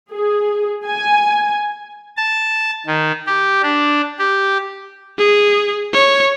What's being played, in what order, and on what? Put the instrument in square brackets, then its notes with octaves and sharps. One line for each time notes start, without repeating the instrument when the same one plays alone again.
[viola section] G#4
G#5
[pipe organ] A5
D#3
G4
D4
G4
[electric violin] G#4
C#5